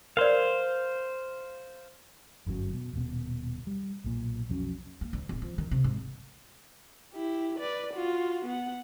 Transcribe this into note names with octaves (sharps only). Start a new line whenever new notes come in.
A#4 C5 D5 F5
G1 F#2 D#3 F#3
B2
D#1 B2
G3
B1 A#2
B1 F2 F#3 C#4
A#3
D2
D1
F3
D#3
C3
G#2
E4 G4
B4 D5
F4 F#4
B3 F#5